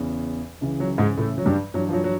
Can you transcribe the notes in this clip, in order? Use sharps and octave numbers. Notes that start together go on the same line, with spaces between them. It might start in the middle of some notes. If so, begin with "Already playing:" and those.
Already playing: E2 C#3 E3
C#2 C#3 E3
F#3
G#2 G#3
A2 A3
F#3
G2 G3
G2 E3 F#3
F3
F#3
F#3